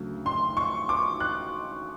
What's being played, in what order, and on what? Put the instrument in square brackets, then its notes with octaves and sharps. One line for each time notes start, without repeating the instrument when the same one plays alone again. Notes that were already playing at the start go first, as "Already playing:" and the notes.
Already playing: [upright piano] D2 C#3 F#3
C6
C#6
D6
F#6